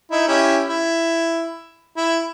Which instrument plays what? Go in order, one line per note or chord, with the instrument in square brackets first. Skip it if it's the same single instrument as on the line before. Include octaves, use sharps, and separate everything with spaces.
[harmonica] D#4 E4
C#4 E4 G4
E4
E4